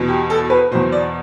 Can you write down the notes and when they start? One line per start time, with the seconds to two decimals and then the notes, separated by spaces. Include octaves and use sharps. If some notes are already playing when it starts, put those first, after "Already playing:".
Already playing: E2 B2
0.08 G4
0.30 A4
0.50 B4
0.71 B2 C5
0.75 E2
0.92 D5